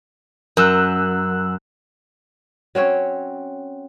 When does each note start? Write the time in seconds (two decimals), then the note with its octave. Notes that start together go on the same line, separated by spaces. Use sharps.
0.57 F#2 A#4 E6 F#6
2.75 F#3 C4 C#4 C#5